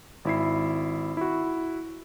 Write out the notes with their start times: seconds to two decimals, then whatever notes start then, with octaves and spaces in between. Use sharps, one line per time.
0.25 G#1 E4 C7
1.17 E4 F#4